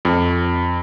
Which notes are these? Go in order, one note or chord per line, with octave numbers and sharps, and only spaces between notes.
F2